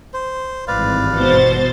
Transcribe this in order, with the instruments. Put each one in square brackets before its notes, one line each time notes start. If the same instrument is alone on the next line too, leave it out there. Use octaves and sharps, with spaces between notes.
[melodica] C5
[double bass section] G#1 G2 E3 [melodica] B4 D5 F5
[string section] B2 C5 A6